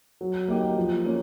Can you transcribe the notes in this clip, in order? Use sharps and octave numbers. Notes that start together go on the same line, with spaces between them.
F#3
A#3 D#4 G4
F3
A#3 C#4